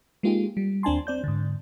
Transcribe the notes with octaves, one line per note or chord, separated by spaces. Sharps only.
G#3 A#3 D#4 F4 G4 G#4
G3
D#2 C4 D4 G#5 A5 C6
C4 D5 G6
G#2 D3